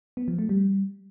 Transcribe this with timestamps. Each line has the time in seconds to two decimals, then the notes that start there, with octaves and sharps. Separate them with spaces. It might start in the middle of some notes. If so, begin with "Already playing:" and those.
0.17 B3
0.28 F3
0.39 A3
0.49 G3